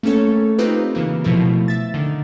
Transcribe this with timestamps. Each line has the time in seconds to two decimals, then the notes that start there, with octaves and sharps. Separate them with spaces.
0.03 A3 A#3 C#4 A4 C#5
0.58 C4 D#4 F4 G4 B4
0.95 C#3 E3 A#3
1.24 B2 F3 A3 E4
1.68 E5 A6
1.94 D3 D#3